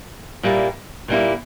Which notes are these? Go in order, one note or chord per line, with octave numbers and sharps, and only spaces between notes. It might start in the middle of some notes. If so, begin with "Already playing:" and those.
A#2 G3 A#3 E4
A#2 G3 A#3 E4